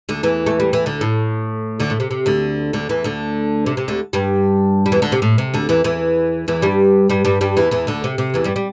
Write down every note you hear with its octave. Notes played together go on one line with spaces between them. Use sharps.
D2 D3
E2 E3
A3
G3
E3
D2 D3
A2
D2 D3
A2
C3
C3
D2 D3
D2 D3
E2 E3
D2 D3
C3
C3
D2 D3
G2 G3
G3
E2 E3
D2 D3
C3
A2
C3
D2 D3
E2 E3
E2 E3
E2 E3
G2 G3
G2 G3
G2 G3
G2 G3
E2 E3
E2 E3
D2 D3
C3
C3
E2 E3
G2 G3
G3